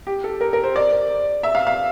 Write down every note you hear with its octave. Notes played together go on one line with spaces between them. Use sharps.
G4
A4
A#4
A#4
C5
D5
E5
F5
F5